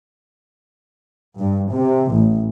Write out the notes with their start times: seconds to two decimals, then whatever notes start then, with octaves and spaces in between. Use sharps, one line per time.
1.39 G2
1.72 C3
2.14 A1